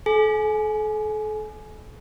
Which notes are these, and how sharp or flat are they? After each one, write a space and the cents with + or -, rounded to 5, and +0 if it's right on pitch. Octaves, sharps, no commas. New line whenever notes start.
A4 -40 G#5 +20